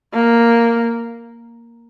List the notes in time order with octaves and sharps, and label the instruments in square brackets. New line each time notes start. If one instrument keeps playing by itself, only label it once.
[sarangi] A#3